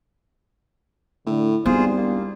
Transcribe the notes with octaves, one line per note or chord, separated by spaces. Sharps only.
A2 D3
G#1 G3 B3 F4 G#4 C5
E1 A#3